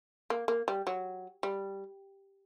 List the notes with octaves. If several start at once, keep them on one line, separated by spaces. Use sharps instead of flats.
A#3
A#3
G3
F#3
G3